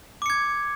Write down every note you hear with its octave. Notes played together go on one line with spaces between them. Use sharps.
D6 G#6 C#7